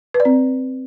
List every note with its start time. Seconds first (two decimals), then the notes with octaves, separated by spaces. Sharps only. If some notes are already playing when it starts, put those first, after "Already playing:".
0.14 B4
0.20 D5
0.25 C4